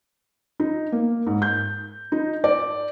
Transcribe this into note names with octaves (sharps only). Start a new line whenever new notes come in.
D#4
A#3
G#2
G6
D#4
D5